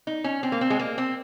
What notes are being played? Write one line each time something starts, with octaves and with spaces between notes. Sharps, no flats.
D#4
C#4
C4
A#3
C4
G#3
A#3
C4